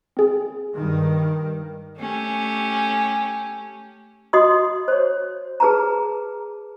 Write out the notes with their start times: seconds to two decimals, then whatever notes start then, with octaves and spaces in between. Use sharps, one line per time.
0.17 C4 G#4
0.75 G2 D#3
1.99 A3 C#4 G4
4.33 F#4 D#5 C6 D#6
4.88 C5 C#5
5.60 G#4 B4 A5 A#5